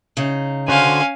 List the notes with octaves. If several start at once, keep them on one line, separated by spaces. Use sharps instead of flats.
C#3 D#4
D3 C#4 F#4 C5 F5 G#5